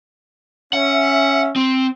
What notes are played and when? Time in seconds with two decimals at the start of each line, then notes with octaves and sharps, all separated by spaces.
0.73 C#4 E5 F#5
1.56 C4